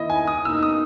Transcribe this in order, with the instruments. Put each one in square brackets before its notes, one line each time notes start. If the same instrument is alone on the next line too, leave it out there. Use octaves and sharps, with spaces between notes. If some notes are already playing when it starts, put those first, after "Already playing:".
Already playing: [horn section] D#3 A#3 E4 [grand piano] D#5
[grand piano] G#5
D#6
[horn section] B2 A#3 D#4 [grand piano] E6
[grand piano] D#6